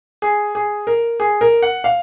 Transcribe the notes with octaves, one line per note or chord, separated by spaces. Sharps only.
G#4
G#4
A#4
G#4
A#4
F#5
F5